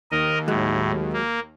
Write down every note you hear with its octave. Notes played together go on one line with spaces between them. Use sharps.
D#2 A#4 D#5
A2 F#3 G#3
A#3